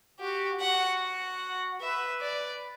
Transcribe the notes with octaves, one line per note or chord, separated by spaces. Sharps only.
F#4 G4
F#4 F#5
F#5
B4 E5
D5